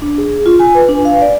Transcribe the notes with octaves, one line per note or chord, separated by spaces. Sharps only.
D4
G#4
F4
G#5
B4
D4
F5
D5